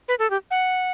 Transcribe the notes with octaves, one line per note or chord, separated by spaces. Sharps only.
B4
A4
G4
F#5